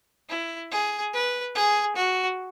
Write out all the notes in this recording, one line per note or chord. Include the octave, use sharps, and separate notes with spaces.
E4
G#4
B4
G#4
F#4